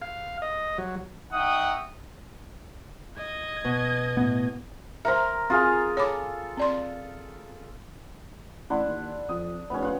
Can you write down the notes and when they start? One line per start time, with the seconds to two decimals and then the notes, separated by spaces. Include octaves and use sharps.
0.02 F5
0.42 D#5
0.78 F#3
1.31 D#4 F#4 E5 F#5 G5 D#6
3.18 D#5 G#6
3.64 B2
4.17 A2 B3
5.05 A#4 C5 E5 A#5 C6
5.50 C4 F4 F#4 G#4 F5
5.97 A4 C#5 B5 D6
6.57 C4 D5 C6
8.70 A1 D4 E4 F#5 C6
8.87 D#2
9.29 F2 D#6
9.70 F1 B3 C#4 B4
9.82 F4 F#5